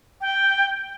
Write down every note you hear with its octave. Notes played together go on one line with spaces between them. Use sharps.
G5